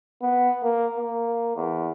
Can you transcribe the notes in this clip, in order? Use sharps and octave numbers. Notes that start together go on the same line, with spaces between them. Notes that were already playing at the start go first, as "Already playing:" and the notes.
B3
A#3
A#3
E2